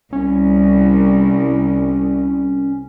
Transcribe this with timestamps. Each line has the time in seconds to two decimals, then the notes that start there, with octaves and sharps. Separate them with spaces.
0.13 C2 C#4